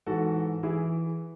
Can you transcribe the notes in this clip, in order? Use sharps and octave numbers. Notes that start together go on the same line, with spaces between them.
G#2 E3 F#4 A4
E3 E4 G#4